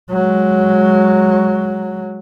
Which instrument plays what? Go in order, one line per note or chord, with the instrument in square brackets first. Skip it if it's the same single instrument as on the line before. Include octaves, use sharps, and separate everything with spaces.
[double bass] F#3 G#3